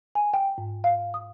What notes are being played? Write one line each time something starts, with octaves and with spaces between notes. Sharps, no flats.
G#5
G5
G#2
F5
D#6